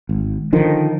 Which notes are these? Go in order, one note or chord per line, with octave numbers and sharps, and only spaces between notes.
G#1
D3 D#3 F3